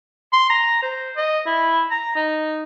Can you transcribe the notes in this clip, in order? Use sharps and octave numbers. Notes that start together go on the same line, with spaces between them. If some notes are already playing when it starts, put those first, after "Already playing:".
C6
A#5
C5
D#5
E4
A#5
D#4